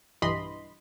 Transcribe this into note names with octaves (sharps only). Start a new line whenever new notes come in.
B1 G2 E3 D#5 B5 C6